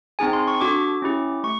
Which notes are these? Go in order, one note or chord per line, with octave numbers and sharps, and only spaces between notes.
C4 D#4 G#4 G#5
C6
C#6
D4 F#4 A4 D6
C#4 E4 G4
A3 C#6